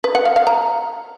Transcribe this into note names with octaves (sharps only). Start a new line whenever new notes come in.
B4
F#5
F5
F5
A#5